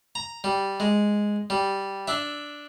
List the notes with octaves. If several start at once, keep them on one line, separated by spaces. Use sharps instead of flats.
A#5
G3
G#3
G3
D4 E5